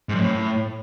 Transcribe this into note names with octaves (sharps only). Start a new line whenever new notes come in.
G#2
F#2
A2